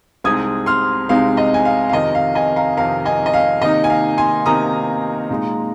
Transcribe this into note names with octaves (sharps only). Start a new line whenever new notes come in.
C2 C3 G#3 C4 D#4 D#6 G#6
C6 F6
C2 C3 G#3 C4 D#4 F5
D#5
G#5
F5
F5
F2 C3 D#3 D#5
F5
D#5 G#5
F5 A#5
F2 C3 D#3 F5 A#5
D#5 G#5
D#5
F5
C3 D#3 A#3 D#4 D#5
G#5
F5
G#5 C6
C3 D#3 A#3 D#4 A#5 D#6
A#2 G#3 D#4